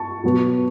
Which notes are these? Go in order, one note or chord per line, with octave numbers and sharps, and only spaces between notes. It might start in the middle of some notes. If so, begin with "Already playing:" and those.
Already playing: A5 C#6
B2 F#3 B3